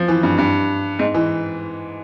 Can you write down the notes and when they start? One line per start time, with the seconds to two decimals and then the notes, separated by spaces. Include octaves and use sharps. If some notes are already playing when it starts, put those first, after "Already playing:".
Already playing: F3
0.08 E3
0.23 G2
0.38 G2
0.99 G#2
1.14 E3